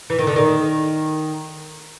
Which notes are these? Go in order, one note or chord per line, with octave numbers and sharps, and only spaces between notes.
E3
D#3
D3
D#3